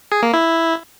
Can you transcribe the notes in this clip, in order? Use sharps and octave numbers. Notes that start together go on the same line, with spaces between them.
G#4
A#3
E4